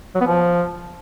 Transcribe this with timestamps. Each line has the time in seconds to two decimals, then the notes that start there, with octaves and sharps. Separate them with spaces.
0.15 F#3
0.21 B3
0.26 F3